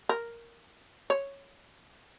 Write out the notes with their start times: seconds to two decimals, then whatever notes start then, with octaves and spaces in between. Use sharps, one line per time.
0.09 A#4
1.10 C#5